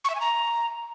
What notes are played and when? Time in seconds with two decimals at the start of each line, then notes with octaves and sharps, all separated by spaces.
0.04 C#6
0.10 E5
0.15 G#5
0.20 A#5